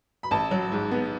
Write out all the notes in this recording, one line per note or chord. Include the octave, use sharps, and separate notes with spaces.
B5
A1 A5
F#3
G#2
B3